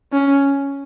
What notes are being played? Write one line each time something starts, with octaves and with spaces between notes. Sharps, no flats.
C#4